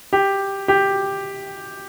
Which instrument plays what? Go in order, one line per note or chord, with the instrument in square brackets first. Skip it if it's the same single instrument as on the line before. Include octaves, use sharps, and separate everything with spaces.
[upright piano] G4
G4